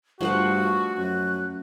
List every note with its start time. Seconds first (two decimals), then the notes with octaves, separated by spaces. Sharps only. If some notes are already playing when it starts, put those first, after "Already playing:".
0.21 G2 F3 A3 F#4 F#5 C#6
0.98 F#2 F#6